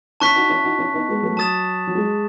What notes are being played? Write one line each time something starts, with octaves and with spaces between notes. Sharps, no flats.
C#4 E4 A5 C#6 F#6 B6
D#4 F#4
C#4 E4
D#4 F#4
C#4 E4
B3 D#4
G#3 B3
F#3 A3
F#3 A5 D#6 A6 E7
F#3
G#3